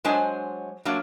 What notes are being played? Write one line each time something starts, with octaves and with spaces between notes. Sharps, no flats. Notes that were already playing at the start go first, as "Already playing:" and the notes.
F#3 G#3 D4 C5 G#5
F#3 A#3 D4